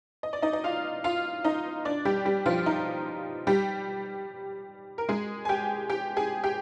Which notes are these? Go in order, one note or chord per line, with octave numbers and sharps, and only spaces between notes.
D#5
D5
D#4 D#5
D#5
F4 F5
F4 F5
D#4 D#5
D4 D5
G3 G4
G3 G4
F3 F4
D#4
G3 G4
A#4
G#3 G#4
G#5
G4 G5
G4 G5
G#4 G#5
G4 G5